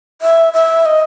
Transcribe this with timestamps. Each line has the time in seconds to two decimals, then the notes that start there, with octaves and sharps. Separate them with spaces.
0.21 E5
0.53 E5
0.85 D#5